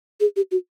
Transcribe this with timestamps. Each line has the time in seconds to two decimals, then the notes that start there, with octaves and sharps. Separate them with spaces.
0.20 G#4
0.36 G4
0.51 F#4